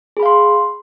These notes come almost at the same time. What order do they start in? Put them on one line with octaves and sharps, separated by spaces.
G#4 B5 F5 C6